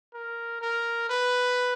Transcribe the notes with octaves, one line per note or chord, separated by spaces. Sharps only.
A#4
A#4
B4